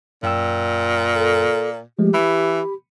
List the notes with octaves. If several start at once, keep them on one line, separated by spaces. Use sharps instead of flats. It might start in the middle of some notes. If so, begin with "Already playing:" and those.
F#2 A#2 G5 E6
A4
F3 G#3 A3 G4
E3 B5